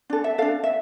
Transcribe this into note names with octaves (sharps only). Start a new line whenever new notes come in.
D4 A4
E5
D4 A4 F5
E5